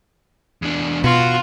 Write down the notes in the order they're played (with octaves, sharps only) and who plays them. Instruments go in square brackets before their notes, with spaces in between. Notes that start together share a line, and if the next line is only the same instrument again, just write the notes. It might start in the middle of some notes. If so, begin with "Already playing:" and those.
[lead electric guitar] E2 D4
[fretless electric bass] B2 [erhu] F4 [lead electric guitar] F#4